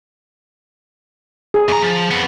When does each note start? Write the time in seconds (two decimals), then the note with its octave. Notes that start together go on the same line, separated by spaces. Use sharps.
1.54 G#4
1.69 E2 A#5
1.82 F3
2.11 F2 B3